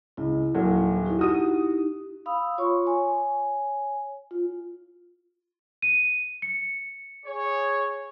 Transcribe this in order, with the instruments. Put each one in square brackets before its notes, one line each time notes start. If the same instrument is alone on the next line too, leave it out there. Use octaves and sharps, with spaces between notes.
[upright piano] C#2 [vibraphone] E4
[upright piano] D#1 F#3 A#3
[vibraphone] D#4 E4 G4
[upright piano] F#4 D#6 D#7
[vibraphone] F5 B5 D#6 E6
F4 C#5 C6 C#6
C#5 G#5
F4
[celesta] D#7
C#7
[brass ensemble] G#4 C#5